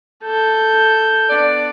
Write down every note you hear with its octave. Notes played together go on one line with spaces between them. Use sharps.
A4 G6
B3 D4 D5